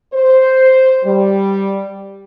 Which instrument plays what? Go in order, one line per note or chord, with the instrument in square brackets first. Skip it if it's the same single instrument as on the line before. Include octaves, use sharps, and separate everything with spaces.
[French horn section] C5
G3